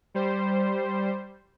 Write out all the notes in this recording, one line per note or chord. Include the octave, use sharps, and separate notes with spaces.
G3 C5